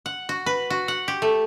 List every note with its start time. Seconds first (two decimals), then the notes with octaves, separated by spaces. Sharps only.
0.06 F#5
0.29 F#4
0.46 B4
0.70 F#4
0.88 F#5
1.08 G4
1.22 A3